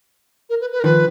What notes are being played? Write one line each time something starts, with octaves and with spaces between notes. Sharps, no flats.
A#4
B4
B4
A#4
D#3 F3 B4